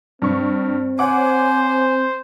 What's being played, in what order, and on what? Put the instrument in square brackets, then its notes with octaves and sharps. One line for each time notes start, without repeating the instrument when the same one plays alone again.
[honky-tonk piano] G2 C#6 [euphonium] C4
[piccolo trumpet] C5 [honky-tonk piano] C#5 F#5 D6 [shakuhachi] G#5